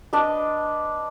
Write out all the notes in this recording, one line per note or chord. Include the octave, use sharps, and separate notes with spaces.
D4 B4 D#5